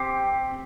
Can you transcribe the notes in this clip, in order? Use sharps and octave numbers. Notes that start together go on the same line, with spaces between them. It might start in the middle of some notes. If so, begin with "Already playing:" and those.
Already playing: C4 G4